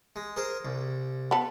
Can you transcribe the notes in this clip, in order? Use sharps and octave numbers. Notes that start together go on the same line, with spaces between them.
G#3
G#4 A#4 C5
C2
B3 A4